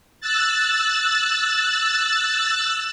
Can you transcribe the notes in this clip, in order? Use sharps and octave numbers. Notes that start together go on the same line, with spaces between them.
E6 F#6 A6